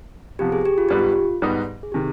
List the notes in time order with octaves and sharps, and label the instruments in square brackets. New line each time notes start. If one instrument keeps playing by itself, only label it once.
[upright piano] C3 F3 B3 [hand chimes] G4
[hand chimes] G#4
G4
F4
[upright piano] G#2 G3 B3 D#4 B4 [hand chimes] G4
[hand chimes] F4
[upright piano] G#2 G3 B3 D#4 B4
[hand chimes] G#4
[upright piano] C3 D#3 [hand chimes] G4